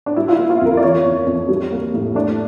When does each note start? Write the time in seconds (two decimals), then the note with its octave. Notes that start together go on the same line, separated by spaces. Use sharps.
0.06 D4
0.16 G3 E4
0.28 F4
0.33 E4
0.39 A#3
0.50 F4
0.61 F2 A#4
0.77 D5
0.83 E3 C#5
1.05 F2
1.26 F2
1.49 G3
1.72 A#3
1.94 A2
2.15 A3 D4